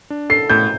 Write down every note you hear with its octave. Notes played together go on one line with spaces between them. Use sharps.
D4
A4 C7
A2 G6